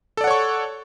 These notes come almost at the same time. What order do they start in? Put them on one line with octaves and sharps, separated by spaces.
A4 D5 F#5 C#5 C#6